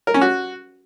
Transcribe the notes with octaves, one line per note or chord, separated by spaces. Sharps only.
A#4
C#4
F#4